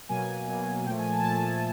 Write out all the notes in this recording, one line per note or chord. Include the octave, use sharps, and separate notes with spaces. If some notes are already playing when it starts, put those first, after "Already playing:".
B2 F#3 A#3 G#5
B2 F#3 A#3
A#2 F3 A3 G5
G#5
A5
A#2 F3 A3 A5